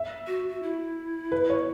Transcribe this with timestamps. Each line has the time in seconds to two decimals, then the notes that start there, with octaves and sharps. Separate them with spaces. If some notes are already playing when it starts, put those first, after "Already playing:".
Already playing: E5
0.27 F#4
0.50 F#4
0.63 E4
1.32 B4
1.50 C#5